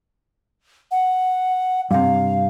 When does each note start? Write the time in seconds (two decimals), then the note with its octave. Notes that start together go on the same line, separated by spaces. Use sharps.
0.91 F#5
1.91 G2 C3 F5